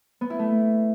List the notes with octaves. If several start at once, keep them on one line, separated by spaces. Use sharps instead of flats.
B3
E4
A3